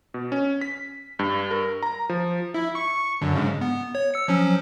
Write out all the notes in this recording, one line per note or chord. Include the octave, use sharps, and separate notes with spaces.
B2
C#4
B6
G2
A#4
A#5
F3
E4
C#6
F#2 D3
G#2 C#3
B3
C#5
E6 C#7
F3 F#3 C#4